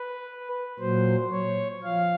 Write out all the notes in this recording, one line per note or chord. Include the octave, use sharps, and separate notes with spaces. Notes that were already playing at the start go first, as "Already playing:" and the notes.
Already playing: B4
A#2 F#3 C5
C#5
F3 F5